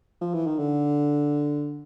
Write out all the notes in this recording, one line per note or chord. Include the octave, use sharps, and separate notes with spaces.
F3
E3
D#3
D3